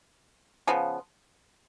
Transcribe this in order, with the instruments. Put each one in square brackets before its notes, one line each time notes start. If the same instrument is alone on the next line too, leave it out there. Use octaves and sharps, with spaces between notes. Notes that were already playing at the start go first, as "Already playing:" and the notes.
[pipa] C#3 F3 B3